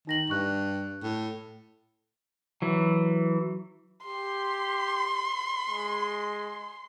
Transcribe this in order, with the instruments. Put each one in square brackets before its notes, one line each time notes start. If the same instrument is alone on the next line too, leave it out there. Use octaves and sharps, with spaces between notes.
[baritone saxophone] D#3 [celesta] D#4 A#6 F#7
[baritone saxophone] G2 [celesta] C#6 F#6
[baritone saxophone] A2
[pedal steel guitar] E3 F#3
[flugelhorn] G4 [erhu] C6
[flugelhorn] G#3